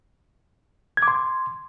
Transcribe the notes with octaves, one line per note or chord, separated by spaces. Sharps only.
G#6
D6
C6